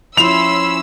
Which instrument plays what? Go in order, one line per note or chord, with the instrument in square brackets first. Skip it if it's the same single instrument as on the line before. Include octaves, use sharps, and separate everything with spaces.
[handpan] F3 E4 [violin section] C#4 E6 [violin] B5 C6 [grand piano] F7